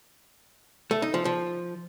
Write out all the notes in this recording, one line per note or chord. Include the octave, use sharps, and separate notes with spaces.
A3
D#4
F3
F3